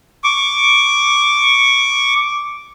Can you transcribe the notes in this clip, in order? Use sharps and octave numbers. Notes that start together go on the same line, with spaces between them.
C#6 D6